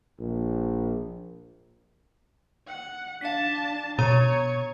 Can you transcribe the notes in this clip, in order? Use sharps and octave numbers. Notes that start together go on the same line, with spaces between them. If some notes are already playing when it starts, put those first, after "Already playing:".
A#1
F#5
D4 F5 A5 B6
B2 B3 C#5 A#5 D#7